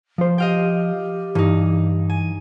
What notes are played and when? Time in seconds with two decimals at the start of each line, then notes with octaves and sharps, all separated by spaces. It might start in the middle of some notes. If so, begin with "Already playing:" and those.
0.18 F3 C5
0.38 G4 D#5 F5 G5
1.35 G2 E3 D#4
2.10 G#5